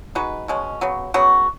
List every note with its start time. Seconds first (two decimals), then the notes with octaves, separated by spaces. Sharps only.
0.15 G#3 D#4 F#4 B4
0.48 B2 G#3 C#4
0.81 C#3 F#3 B3
1.14 C#3 F#3 B3 F#4